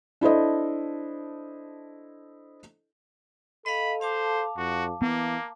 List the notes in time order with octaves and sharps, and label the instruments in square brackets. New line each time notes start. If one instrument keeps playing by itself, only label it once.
[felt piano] D4 E4 A4 C5 D#5
[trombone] A4 [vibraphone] D#5 F5 [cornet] B5
[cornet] C5 [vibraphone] F5 A5 D6
[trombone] F2 [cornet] F#4
[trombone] E3 [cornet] A#3 [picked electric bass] B3